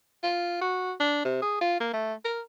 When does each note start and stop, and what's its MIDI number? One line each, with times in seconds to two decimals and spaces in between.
0.23 0.62 65
0.62 0.93 66
1.00 1.24 62
1.25 1.40 48
1.42 1.56 68
1.61 1.79 65
1.80 1.91 58
1.93 2.14 57
2.25 2.41 70